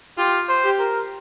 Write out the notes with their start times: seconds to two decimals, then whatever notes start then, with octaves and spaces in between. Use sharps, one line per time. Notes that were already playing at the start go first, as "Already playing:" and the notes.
0.18 F4 G4
0.49 C5
0.64 G4
0.79 A#4